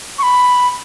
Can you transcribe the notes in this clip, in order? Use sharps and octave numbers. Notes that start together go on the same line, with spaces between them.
C#6
B5